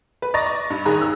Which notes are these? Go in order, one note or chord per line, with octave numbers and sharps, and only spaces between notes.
B4
D5 D#5 A#5 C#6 A6 A#6
C#6
G2
A1 D#3 G#4 A#5 F#6
E6